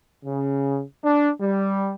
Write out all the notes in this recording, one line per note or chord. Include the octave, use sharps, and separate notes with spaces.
C#3
D4
G3